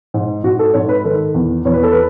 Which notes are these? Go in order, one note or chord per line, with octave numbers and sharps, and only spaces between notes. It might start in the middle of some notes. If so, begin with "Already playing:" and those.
G#2
G#2 F#4
A4
G#2 C#5
B4
D#3 A4
E2
E2 C#5
B4
A4
B4